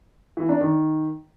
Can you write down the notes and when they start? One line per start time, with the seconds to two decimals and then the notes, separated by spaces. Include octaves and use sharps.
0.37 E3
0.49 D4
0.61 D#3